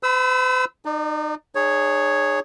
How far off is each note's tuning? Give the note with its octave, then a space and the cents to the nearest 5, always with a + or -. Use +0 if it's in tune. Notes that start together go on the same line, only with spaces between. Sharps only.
C5 -45 B5 +5 E6 -15
D#4 -30 D5 +20
D4 +45 G#4 +0 C#5 +0